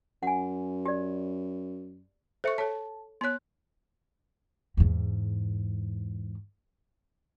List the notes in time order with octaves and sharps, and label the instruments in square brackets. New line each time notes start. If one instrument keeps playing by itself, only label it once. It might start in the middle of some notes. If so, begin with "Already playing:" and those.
[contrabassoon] F#2 [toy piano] F#5 G#5
[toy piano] G4 D5
[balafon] A4 C#6 [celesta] C5 E5 C#7
[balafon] A4 C#5 [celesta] A5
[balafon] B3 C#5 [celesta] C6 F#6
[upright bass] E2 G#2